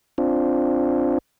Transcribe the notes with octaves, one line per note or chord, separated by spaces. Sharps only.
C4 D4 F4